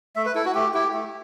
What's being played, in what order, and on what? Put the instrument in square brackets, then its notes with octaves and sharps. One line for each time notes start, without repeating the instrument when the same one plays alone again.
[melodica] A3 E5
B4
E4 A4
F#4
A3 G4
E4 G4
A3